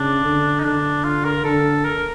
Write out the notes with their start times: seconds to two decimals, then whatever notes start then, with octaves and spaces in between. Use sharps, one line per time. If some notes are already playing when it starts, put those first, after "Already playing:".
Already playing: C#3 D4
0.24 D3
0.60 D#4
0.64 D3 D4
1.04 F4
1.25 A#4
1.44 D3 A4
1.85 A#4